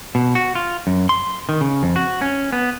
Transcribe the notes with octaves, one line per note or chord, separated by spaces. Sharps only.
B2
F#4
F4
F#2
C6
D#3
C#3
F2
F#4
C#4
B3